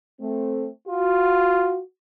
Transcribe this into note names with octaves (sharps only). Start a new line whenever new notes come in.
A3 C4
F4 F#4